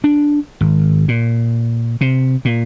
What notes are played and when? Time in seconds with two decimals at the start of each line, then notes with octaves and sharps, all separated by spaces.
0.04 D4
0.61 G#1
1.08 A#2
2.01 C3
2.45 A#2